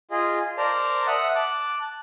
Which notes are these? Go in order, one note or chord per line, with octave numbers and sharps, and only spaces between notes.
F4 G#4 D#5
A#4 C5 D5 A5 A#5
E5 F#5 D#6 F#6
A5 D6 F#6